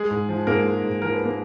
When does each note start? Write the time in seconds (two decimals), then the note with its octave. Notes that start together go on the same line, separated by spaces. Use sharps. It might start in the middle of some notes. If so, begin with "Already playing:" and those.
Already playing: G#3 G#4
0.11 G#2
0.29 F3
0.47 G#2 A#3 A#4
0.65 G#3
0.84 G#2
1.02 F3 A#4
1.14 B4
1.25 A#3 A#4